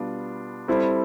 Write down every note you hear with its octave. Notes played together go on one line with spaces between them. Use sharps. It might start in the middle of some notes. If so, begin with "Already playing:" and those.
Already playing: B2 G3 B3 D4 F4
G3 C4 E4 A4 C5